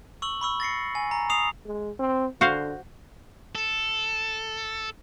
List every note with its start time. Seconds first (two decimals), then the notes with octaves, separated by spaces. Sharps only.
0.22 C#6 E6 F#7
0.41 B5 C#6 E6
0.60 A6 A#6 C7 C#7
0.95 G#5
1.11 A#5
1.30 D#6 C7 F7
1.66 G#3
1.99 C4
2.41 D3 F#4 C5 F5
3.55 A4